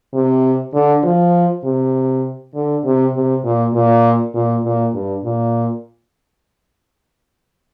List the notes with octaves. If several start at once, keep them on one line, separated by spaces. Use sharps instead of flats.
C3
D3
F3
C3
D3
C3
C3
A#2
A#2
A#2
A#2
G2
A#2